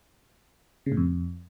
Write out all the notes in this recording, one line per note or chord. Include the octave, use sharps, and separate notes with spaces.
C#3
A2
F2